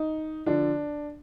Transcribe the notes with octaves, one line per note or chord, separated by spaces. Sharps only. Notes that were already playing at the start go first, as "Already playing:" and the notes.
Already playing: D#4
D3 F3 D4